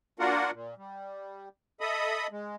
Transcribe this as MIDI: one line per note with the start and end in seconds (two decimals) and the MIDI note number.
0.20 0.51 58
0.20 0.51 62
0.20 0.51 65
0.20 0.51 66
0.20 0.51 70
0.20 0.51 78
0.53 0.74 46
0.77 1.49 55
1.80 2.27 69
1.80 2.27 75
1.80 2.27 76
1.80 2.27 83
1.80 2.27 87
2.32 2.56 56